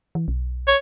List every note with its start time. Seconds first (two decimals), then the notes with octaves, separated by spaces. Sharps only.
0.15 E3
0.28 B1
0.67 C#5